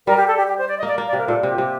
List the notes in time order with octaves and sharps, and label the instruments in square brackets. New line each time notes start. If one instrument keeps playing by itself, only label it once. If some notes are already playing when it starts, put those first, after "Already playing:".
[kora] G3 [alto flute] A#4
[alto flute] G4
A4
G4
G4
C5
D5
D#5
[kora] A#3
[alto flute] D5
[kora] A#3
[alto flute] D5
[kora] C3
[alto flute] A#4
[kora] A#2 [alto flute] A4
[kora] C3 [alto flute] G4
[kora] C3